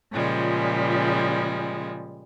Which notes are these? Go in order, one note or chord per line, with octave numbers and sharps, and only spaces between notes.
A#2 C#3 F3 G3 G#3